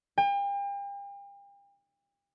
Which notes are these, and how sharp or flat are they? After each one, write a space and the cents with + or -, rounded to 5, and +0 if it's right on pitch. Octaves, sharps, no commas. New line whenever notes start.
G5 +40